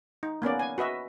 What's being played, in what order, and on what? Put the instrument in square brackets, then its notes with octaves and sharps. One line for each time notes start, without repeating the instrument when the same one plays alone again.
[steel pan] D#4
A#3 B3 C#4 D5
G#5
F#4 B4 D#5 E5